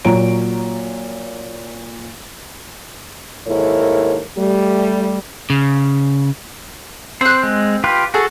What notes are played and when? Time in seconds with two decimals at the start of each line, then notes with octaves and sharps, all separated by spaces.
0.05 A#2 F#3 F4 C#5 A#5 D7
3.47 D#2 G#2 E4 A4 A#4 C#5
4.37 G3 A3
5.50 C#3
7.21 C4 C5 F#6
7.43 G#3
7.84 F4 G4 B4
8.14 F#4 G#4 A4